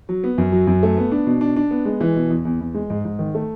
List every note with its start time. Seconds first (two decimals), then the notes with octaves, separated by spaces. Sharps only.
0.09 F#3
0.24 B3
0.38 F#2
0.52 F#3
0.67 F#2
0.83 A3
0.97 B3
1.11 D4
1.27 B2
1.41 D4
1.56 D4
1.71 B3
1.85 G#3
2.01 E3
2.16 B2
2.30 E2
2.45 E2
2.61 E2
2.74 G#3
2.90 G#2
3.05 G#2
3.19 D#3
3.35 A3